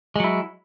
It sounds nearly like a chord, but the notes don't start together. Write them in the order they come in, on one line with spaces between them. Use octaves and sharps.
G#3 F#3 E4